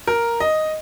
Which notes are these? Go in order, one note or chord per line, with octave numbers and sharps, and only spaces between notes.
A#4
D#5